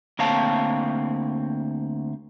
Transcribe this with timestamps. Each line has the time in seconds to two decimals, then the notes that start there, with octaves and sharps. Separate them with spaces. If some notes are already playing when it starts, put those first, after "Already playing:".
0.19 D2 A#3 C4 C#5 F5 A5